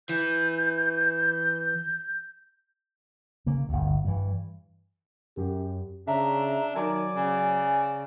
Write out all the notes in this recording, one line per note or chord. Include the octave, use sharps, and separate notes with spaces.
E3 G6
C#3 A#3
G1 D2
G2 E3
F#2 G4
C#3 D4 E5 A#5
D#3 F#3 D5 G#5
C#3